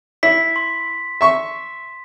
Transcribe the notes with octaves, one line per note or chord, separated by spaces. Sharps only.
E4 B6
C6
E5 C#6